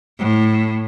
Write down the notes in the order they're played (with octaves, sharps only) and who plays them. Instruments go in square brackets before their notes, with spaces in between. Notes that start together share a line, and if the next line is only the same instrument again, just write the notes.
[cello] A2